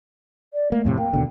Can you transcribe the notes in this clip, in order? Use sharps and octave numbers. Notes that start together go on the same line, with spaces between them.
D5
A3 A#3
F2 A2 C3
A#3 G5
D#2 B2 D3